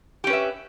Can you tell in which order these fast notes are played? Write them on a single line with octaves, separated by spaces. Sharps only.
G4 C#4 B4 E5